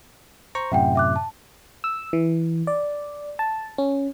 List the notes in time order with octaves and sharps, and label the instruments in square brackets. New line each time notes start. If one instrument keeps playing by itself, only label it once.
[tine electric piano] C5 A#5 C#6
[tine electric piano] F#2 A2 C3 [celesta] E5 F#5 G5
[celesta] E5 D6 F#6
A5
[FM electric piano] E6
E3
D5
A5
C#4